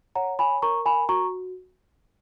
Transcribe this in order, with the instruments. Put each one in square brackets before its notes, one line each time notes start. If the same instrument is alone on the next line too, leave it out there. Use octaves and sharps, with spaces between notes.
[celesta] C#5 F#5 A#5
G#5 B5
A#4 A#5 C#6
G#5 B5
F#4 A#5 C#6